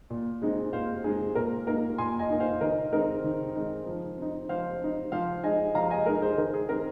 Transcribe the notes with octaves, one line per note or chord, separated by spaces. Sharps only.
A#2
G#3 C4 D#4
A#2 C5 F5
G#3 C4 D#4 G#4
A#2 A#4
A#3 D#4 A#4
A#2 G#5 C6
D#5 G#5
A#3 D#4
C5 F5
D#3 A#4 D#5
G#3 C4 D#4 A#4
D#3
G#3 C4 D#4
F3
C4 D#4
F3 C5 F5
C4 D#4
F3 C5 F5
G#3 D#4 D#5 G#5
F3 F5 A#5
D#5 G#5
G#3 D#4 A#4 D#5
G#4 C5
D#3 A#4
G#4
C4 D#4 A#4